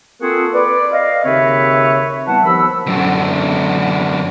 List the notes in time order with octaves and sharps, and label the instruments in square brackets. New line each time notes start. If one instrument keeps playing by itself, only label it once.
[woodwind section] A#3 C4 F4 F#4 G#4 A4
B4 D5
D#5 F5
D#2 C#3 C4 B4 C#5 E5
E3 G3 B3 F#4 F#5 A5
D#2 F3 B3 B5 E6
[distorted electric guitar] F#2 D3